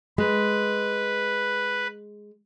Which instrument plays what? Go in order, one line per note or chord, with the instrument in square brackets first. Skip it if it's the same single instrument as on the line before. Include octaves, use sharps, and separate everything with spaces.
[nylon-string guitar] G#3 [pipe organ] B4